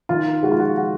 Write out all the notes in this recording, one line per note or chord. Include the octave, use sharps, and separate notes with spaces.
D#3 F4
G#3 F#4
F4
F#4
F#4